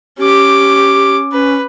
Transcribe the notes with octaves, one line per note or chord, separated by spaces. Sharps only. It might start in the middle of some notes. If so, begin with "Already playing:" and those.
C#4 G4 D6
C#4 B4